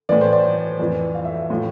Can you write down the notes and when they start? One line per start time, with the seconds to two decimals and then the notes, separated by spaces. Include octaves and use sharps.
0.09 A2 E3 D5
0.21 C5
0.33 D5
0.80 F2 E3
1.15 F5
1.25 E5
1.34 F5
1.50 A2 F3